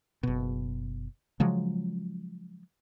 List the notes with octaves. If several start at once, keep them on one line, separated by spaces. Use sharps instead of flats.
F#1 B2
C#3 F3 F#3 G#3